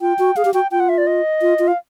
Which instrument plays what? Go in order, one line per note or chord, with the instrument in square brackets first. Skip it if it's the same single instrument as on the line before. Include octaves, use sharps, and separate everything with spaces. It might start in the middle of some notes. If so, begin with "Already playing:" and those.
[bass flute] F4 [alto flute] G5
[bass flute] F#4
[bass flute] G#4 [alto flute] F5
[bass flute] G4
[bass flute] F#4 [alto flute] G5
[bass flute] F4 [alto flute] G5
[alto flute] F#5
E5
D5
D#5
[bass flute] F4
F4
[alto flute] F5